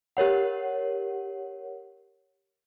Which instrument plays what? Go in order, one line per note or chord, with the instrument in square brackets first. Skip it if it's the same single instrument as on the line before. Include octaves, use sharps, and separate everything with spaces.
[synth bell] G4 A#4 C#5 F#5